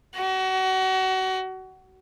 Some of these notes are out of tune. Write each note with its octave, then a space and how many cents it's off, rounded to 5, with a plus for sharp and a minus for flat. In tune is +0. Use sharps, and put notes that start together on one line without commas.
F#4 +30